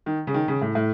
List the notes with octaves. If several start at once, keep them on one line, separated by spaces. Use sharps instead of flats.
D#3
C#3
D#3
C#3
A2
A2